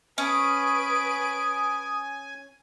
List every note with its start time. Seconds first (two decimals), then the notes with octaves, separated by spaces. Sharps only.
0.18 C#4 B4 G#5 D#6 D7